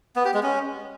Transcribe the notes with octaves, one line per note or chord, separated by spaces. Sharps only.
B3
G4
G#3
C#4